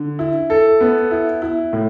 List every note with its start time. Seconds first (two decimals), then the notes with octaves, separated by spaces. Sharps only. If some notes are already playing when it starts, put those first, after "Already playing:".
Already playing: D3
0.19 E4
0.50 A4
0.81 B3
1.11 E4
1.42 E4
1.73 A2